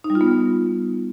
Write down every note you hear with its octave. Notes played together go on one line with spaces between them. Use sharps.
D#4
G3
F4
B3